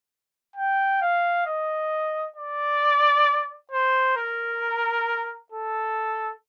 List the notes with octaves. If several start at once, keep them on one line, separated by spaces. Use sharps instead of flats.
G5
F5
D#5
D5
C5
A#4
A4